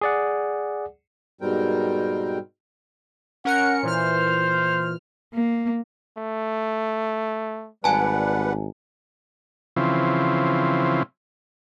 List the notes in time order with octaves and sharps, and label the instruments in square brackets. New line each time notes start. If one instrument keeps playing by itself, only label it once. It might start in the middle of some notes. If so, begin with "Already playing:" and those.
[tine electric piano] G#4 D5 F#5
[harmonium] G#2 B2 G3 C4 A#4 G5
[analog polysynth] C#4 A#4 C#7 [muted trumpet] F#5
[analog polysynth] A#2 E3 F6 [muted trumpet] C5
[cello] A#3
[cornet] A3
[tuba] G#1 [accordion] G3 B4 F#5 [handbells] G#5 A5
[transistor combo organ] C#3 E3 F3 C4